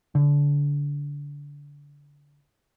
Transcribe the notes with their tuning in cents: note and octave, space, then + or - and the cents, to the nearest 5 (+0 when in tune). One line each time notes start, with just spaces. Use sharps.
D3 -25